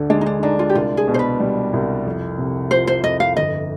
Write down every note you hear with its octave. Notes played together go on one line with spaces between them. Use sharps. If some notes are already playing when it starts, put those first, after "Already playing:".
Already playing: D2 D3
G#3 D4
D#4
D4
D4 D#4
F4
G4
C2 F4
G#4
B2
C5
B4
G3
C2
F2
C3
F3 C5
C5
F2 D#5
F5
G1 D#5